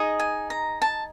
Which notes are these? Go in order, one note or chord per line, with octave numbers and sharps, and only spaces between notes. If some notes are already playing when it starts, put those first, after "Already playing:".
Already playing: D#4 G#4 D#5
G#5
A#5
A5